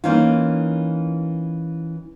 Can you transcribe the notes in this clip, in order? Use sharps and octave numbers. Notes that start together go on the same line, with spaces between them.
E3 A#3 C#4 D#4 F4